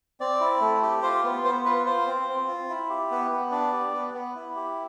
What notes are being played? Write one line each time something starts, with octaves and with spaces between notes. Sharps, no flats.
C4 D5
E4
A3
G4
F4 C5
B3
B3 C5
F4 B4
F4 C5
C4
C4
F4
E4
G4
B3
B3
D4 D5
G4
B3
B3
E4
G4